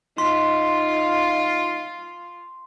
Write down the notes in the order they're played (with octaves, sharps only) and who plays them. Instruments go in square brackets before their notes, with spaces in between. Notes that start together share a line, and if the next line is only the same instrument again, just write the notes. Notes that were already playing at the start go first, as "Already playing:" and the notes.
[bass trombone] D#4 [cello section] F4 [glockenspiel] C6 B6